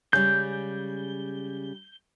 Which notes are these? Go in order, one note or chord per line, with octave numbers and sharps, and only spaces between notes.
C#3 G3 G#3 G6